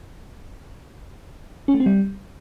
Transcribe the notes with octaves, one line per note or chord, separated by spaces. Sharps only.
C#4
A3
C4
G3